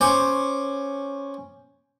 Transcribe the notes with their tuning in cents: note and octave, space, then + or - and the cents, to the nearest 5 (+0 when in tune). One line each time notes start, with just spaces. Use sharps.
C#4 +0 C5 +0 D6 +10